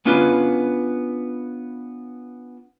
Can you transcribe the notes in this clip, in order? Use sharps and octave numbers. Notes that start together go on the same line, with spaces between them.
B3 C#4 D4 F4 B4